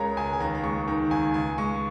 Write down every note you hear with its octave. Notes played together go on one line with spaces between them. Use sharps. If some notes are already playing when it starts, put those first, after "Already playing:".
Already playing: C#2 C#3 G#3 A#4 C#5 A#5
C#2 G#5
G#5
D#2 A#5
A#5
G#3 C#6
D#3 A#5
D#2 G#5
C#2 G#5
G#3 C#6